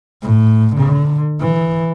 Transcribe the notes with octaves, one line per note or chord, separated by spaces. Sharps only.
A2
D3
E3